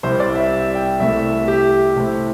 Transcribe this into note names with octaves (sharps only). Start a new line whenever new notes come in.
C2 C3 G3 E4 C5
D5
E5
E5
G5
C2 C3 A3 E4 E5
G4
C3 A3 C4 E4